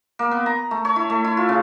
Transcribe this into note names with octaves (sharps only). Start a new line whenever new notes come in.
A#3
B3
A#5
A3
C#5
E4
A3
E4
F4
C#3